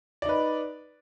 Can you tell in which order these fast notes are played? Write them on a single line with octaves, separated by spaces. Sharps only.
D5 D#4 B4